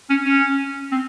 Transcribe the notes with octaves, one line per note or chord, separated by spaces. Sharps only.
C#4
C#4
C4